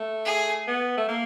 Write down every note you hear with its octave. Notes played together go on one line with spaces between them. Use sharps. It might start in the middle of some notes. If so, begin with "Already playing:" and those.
Already playing: A3
G#4
B3
A3
A#3